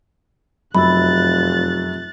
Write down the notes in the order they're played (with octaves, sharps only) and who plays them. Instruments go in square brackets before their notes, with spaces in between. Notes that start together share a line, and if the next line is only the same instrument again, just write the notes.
[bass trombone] F1 [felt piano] F#2 [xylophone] B5 E6 [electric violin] F#6 A6